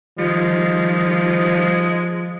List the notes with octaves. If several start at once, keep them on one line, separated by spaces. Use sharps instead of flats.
D#3 F3 G3 G#3 F4